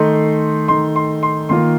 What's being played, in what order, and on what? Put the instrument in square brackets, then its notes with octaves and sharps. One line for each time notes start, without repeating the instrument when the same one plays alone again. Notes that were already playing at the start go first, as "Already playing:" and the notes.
Already playing: [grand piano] D#3 A3 D#4 C6
D#3 A3 D#4 C6
C6
C6
D#3 A#3 F4 C6